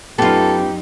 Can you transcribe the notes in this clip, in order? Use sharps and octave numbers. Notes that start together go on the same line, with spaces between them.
F#2 B3 D#4 F4 G4 A4